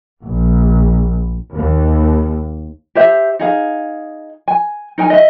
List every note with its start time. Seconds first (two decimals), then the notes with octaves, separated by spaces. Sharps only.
0.24 A#1
1.53 D#2
2.95 G4 C5 E5
3.39 D#4 G#4 F5
4.48 G#5
4.98 D#4 A#4 G#5
5.10 D#5 E5